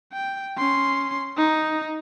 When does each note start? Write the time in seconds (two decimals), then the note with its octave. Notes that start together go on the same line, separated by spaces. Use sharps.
0.13 G5
0.58 C#4 C6
1.37 D#4